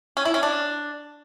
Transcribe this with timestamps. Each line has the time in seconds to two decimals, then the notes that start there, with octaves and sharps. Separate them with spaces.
0.17 C#4
0.25 E4
0.34 C#4
0.43 D4